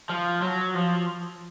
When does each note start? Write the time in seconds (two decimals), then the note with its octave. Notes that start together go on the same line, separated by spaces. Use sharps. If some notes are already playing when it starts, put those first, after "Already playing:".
0.09 F3
0.42 F#3
0.75 F3